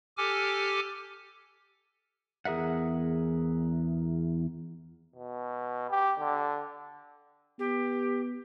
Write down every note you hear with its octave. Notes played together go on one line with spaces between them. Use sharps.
G4 A4 G#5 D6 F6
E2 G#4 A#4 E5 F#5
B2
G4
D3
B3 G4